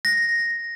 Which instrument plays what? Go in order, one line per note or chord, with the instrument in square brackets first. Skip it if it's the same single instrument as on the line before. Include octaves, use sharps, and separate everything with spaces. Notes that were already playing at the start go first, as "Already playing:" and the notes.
[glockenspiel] A#6